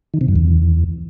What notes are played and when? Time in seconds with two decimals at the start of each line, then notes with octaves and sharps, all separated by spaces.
0.14 D#3
0.21 C3
0.28 F#2
0.36 E2